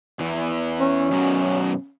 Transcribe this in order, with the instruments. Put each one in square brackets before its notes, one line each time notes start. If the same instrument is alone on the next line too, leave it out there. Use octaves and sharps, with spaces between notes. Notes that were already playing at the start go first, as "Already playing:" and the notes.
[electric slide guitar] E2 E3
[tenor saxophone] C#4
[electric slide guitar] F#2 B2 F#3